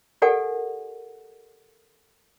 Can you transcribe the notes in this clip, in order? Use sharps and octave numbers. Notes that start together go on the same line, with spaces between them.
G4 A4 A#4 D5 F#5 G#5